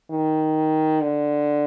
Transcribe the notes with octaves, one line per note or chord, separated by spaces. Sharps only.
D#3
D3